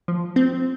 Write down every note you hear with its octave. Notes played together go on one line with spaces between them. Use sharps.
F3
C4